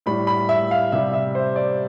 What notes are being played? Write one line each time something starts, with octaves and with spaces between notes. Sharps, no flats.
A2 G3 B5
B5
E5
F5
C3 G3 E5
E5
C5
D5